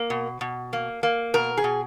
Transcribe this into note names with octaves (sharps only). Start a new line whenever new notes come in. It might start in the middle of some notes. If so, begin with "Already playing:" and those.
Already playing: A#3
B2
B2
A#3
A#3
B2 A#4
G#4
B2